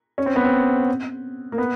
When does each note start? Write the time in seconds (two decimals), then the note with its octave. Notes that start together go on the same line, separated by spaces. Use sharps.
0.18 C#4
0.26 C4
0.36 B3
0.44 C4
1.52 A#3
1.58 B3